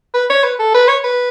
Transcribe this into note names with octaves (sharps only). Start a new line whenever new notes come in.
B4
C#5
B4
A4
B4
C#5
B4